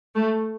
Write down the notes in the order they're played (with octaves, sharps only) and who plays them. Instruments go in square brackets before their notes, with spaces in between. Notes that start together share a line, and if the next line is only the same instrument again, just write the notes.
[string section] A3